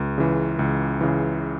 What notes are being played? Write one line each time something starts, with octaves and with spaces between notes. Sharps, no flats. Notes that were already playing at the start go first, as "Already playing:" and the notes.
Already playing: C#2
C#3 E3
C#2
C#3 E3